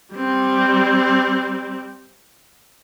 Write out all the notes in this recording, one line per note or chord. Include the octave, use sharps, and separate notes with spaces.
G3 C4